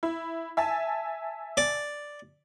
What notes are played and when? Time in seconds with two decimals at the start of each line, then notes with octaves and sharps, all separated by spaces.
0.03 E4
0.57 E5 G#5 A5
1.57 D5